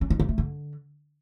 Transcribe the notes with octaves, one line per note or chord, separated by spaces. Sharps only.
C#4
D#4
A#3
A3
D3